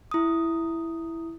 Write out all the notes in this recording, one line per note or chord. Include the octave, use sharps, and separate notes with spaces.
E4 D#6